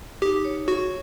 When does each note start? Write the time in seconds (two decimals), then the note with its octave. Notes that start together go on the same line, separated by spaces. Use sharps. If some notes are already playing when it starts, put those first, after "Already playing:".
0.22 D#4 G4
0.45 C#5
0.68 F#4 G#4